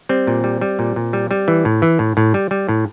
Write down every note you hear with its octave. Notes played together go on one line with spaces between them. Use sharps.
G3 C4
A#2
G3
G3
A#2
A#2
G3
G3
E3
A2
E3
A2
A2
G3
G3
A2